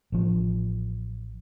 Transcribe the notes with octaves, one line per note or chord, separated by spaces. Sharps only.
A1 F3